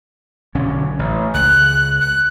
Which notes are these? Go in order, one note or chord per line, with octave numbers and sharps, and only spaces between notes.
B1 D3 C#4
A1
C#2 F#6
F#6